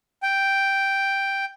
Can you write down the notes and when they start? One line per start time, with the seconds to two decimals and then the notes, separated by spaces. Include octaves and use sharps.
0.23 G5